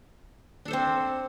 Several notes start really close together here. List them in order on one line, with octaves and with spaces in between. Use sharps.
D4 A4 C5 C4